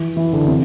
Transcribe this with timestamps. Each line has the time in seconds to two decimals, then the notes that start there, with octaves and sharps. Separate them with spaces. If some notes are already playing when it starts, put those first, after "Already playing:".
Already playing: E3
0.17 E3
0.33 D3
0.48 C3